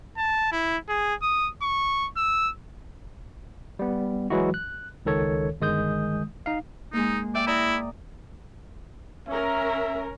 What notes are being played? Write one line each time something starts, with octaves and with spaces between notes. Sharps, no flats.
A5
E4
G#4
D#6
C#6
E6
G3 B3
E3 F#3 G#3 E4 F#4
F#6
C#2 D#3 A4 C#5
G1 D#3 G#3 D#6 G6
D#4 F5
G#3 A#3 D#4
D5 E5 G5
E4 D5 A#5 D#6
C#4 A#4 E5